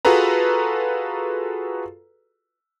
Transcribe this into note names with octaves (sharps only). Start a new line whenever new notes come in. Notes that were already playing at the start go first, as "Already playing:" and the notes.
F4 F#4 G#4 A4 B4 A#5